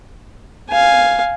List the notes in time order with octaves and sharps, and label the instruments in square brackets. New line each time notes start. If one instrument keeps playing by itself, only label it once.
[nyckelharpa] F5 G#5